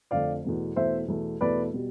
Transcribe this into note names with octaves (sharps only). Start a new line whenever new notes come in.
F2 D3 A3 D5 F5
E2 B2 A3
E2 B2 A3 C5 E5
E2 B2 A3
E2 B2 A3 B4 D5
B2 G3